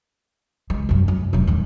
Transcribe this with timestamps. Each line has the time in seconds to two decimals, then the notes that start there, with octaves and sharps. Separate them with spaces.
0.70 C#2 G#3
0.89 C2 F#2
1.08 F#2
1.33 E1 F#2
1.47 D#1 D#3